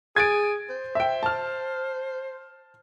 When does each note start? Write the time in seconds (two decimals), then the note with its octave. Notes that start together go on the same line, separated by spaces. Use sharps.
0.16 G#4 G#6 A6 D7
0.70 C5
0.95 E5 G5
1.23 A5 F6